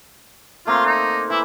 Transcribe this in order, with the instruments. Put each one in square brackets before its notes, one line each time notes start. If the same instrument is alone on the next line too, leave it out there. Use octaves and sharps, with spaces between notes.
[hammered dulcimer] A3 A#3 C4 [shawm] F4
[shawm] D#4
[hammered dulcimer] E3 [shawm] E4